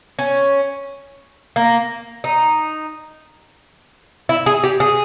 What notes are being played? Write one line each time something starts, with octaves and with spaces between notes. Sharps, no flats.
C#4
A#3
D#4
E4
G#4
G4
G#4